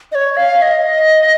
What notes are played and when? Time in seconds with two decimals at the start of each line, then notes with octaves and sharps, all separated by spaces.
0.12 D#5
0.15 C#5
0.37 F5
0.62 D#5